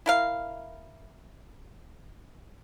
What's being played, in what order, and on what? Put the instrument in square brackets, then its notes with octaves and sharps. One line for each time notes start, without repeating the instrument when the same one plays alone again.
[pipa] E4 A#4 F5